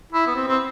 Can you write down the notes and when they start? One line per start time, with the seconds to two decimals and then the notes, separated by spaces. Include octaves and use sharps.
0.13 E4
0.27 B3
0.35 C4
0.48 C4